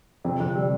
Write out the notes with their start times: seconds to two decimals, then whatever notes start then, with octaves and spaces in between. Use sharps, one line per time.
0.25 F2 C3
0.40 F2 D3
0.55 C3 G3